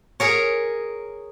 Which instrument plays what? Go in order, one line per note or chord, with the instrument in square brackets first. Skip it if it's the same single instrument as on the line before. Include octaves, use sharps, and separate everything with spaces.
[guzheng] G#4 A#4 C#5